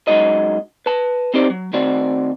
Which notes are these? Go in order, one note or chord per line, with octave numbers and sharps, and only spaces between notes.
F#2 F3 G#3 D#4 F#4 D#5
B4 A5
C4 D#4 G4 C5 D5
F#3
D#3 A3 C4 F#4 D5